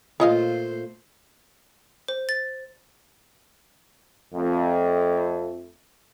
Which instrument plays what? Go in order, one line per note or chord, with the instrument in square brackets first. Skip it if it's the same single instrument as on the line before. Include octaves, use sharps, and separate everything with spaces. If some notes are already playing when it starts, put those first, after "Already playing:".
[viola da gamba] A#2 A3 C5 [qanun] F4 [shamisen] C#5 D#5 F5
[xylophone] C5
A6
[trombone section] F2 A3